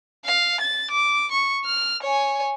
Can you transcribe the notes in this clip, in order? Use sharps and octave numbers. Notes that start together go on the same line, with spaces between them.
F5
A6
D6
C#6
F6
C#5 G#5